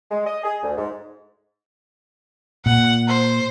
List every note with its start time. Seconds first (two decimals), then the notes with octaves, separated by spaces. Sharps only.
0.11 G#3
0.27 D#5
0.44 G#4
0.63 D2
0.77 G#2
2.66 A#2 F#5
3.09 C5